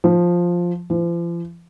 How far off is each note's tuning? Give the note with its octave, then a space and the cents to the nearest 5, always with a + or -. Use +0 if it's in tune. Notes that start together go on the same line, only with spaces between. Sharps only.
F3 +5
F3 -40